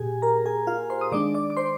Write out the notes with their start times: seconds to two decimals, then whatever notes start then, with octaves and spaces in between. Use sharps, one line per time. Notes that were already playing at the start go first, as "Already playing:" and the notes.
Already playing: A#2 G4 G#4 G#5
0.22 A#4 A#5
0.46 G#4 G#5
0.67 F4 F5
0.90 C5 C6
1.01 D#6
1.12 D#3 G#3 D4 D5 D6
1.34 D5 D6
1.50 D6
1.57 C5 C6